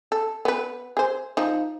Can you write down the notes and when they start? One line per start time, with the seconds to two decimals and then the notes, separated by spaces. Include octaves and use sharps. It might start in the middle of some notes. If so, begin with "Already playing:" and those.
0.12 A4
0.45 B3 B4
0.97 G#4 C5
1.37 F3 D#4